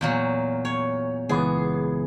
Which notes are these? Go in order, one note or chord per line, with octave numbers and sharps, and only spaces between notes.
E2 A#2 F#3
C#5
C#2 E3 B3 G#4